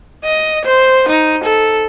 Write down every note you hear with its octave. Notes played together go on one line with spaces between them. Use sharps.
D#5
C5
D#4
A4